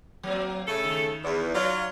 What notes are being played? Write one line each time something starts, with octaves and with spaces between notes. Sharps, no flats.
F#3 A#3 C4
C#3 A3 A4
D#3
E2
F#3 F4 D5